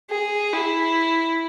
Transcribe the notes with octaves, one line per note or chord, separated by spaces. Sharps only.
G#4
E4